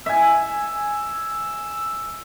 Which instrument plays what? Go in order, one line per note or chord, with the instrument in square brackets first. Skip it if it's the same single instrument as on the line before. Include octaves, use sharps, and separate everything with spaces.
[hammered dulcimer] E5 G#5 [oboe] E6